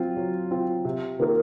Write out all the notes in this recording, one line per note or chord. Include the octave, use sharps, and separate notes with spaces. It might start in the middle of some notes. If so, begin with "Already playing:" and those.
Already playing: F#3 C4 F4
F#3
C4 F4
C3
D#3 A#3 F4 A#4